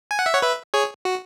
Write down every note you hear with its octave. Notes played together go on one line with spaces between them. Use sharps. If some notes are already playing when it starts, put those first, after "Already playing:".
G#5
F#5
E5
C#5 F#5
B4 E5
G#4 C#5
F#4